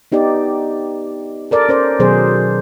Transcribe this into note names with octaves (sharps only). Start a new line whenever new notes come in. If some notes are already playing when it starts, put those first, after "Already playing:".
B3 D#4 G4 D5
A4 A#4 D5
C#4 C5 D5
B2 D#3 F#3 G#4 C5